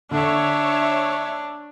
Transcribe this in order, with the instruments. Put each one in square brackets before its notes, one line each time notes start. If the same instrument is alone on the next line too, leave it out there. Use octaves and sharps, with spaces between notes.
[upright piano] D3 [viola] D4 [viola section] C#5 E5